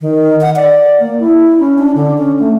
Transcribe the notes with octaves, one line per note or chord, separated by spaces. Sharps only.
D#3
F#5
D5
A#3
E4
C#4
D4
D3
C#4
A3